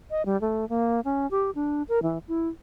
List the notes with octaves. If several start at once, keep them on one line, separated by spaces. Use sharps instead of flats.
D#5
G3
A3
A#3
C#4
G4
D4
A#4
E3
E4